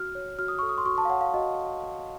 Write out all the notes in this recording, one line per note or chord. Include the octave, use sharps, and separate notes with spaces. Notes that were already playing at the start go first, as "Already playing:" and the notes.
Already playing: F#4 F6
C#5
F#4 F6
D#6
A4 C#6
D#6
C6
F#4 C#6
A5
F5
C#5 F#5
F5
F#4 D#5